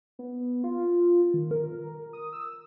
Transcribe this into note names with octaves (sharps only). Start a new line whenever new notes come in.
B3
F4
D#3
A#4
D#6
E6